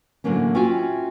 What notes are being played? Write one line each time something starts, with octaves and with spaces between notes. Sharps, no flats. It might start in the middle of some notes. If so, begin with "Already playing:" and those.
A2 D3 E3 F#3 A#3 C#4
C#4 F4 F#4 E5 G5 G#5